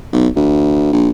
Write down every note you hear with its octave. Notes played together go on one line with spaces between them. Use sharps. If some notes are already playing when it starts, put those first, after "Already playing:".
B1
D2
A#1